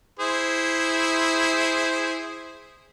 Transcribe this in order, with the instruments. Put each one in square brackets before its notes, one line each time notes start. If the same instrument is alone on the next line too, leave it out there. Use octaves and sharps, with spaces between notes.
[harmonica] E4 G#4 C5